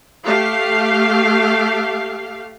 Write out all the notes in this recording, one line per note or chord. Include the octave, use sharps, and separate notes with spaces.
A3 G4 F5